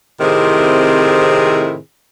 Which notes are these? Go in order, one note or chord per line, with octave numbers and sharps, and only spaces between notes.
A2 C3 D#3 C4 E4 G#4